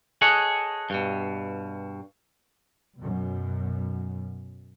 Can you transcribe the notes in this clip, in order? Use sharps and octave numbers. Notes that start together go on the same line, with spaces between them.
G#4 A4 C#5 D#5 F#5
G2 B2
F#2 B2